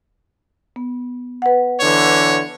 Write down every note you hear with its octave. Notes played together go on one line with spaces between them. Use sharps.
B3
B4 F#5
D3 E3 C#5